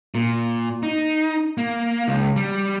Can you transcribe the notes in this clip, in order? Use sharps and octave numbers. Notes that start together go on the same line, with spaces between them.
A#2
D#4
A#3
C#2
G3